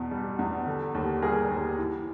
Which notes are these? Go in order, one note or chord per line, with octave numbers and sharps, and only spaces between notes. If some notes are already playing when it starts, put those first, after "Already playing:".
Already playing: E2 B2
G3
E2
D3
D#2
G3 G#4 A#4
D#2
E3